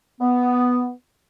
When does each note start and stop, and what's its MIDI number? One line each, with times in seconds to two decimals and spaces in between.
0.21 0.90 59